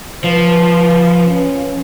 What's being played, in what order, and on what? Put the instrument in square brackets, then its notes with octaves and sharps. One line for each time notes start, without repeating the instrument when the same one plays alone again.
[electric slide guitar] F3 [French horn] B4
[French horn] C#4